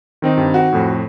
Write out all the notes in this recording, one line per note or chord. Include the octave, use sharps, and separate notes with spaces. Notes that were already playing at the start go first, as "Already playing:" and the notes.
D#3 C4 D#4
G2
F#4
F2 A2